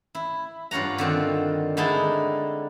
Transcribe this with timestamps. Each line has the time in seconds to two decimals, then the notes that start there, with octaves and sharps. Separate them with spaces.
0.15 E4
0.71 G2 F4 C#5 F#5 A#5
0.98 D3 D#3 C4
1.77 D3 G#3 D#4 E4 A5